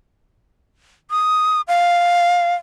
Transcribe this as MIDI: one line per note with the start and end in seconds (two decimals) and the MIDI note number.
1.11 1.61 87
1.68 2.55 77